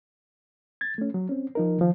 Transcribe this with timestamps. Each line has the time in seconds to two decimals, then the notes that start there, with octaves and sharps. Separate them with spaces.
0.81 G#6 A6
0.98 A3 C#4
1.14 F#3
1.29 C4 C#4
1.55 F3 D#4 A#4
1.78 D#3 F3